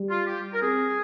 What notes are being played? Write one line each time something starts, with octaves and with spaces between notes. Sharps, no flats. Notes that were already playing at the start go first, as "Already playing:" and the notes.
Already playing: G3
F4
G4
A#4
C4 G#4